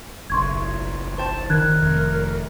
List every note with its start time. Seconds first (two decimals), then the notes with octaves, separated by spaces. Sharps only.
0.30 F#1 B1 C6 C#6 G#6
1.18 C5 G5 A5
1.50 D#3 A#4 F#6 G#6
1.81 F1